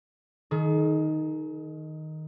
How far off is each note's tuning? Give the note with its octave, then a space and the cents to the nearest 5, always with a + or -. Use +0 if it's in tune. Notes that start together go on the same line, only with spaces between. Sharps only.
D#3 +0 G#4 +45